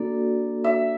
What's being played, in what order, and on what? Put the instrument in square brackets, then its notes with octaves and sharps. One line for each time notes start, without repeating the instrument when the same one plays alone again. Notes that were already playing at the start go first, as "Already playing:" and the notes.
Already playing: [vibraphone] A#3 D4 F#4 A4 D5
[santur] E5